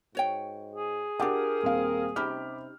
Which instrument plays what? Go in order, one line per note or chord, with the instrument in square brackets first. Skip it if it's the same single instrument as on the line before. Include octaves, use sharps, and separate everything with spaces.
[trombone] G#2 [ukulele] F#4 C#5 G5
[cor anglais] G#4
[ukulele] D4 F4 [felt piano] G4 F#5 D6 [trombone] A#4
[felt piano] D#1 C4 F5
[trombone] C3 [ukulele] C#4 D#4 G4 [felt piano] B5 D6 F6